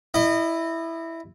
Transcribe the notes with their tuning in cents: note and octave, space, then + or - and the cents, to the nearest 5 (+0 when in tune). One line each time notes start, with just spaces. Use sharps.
E4 +0 D#5 -30